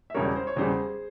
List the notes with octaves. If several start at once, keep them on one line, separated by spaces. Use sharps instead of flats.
E5
E1 E2 C#3 G3 A#4 C#5
C5
C#5
E1 E2 C#3 G3 G#4 C5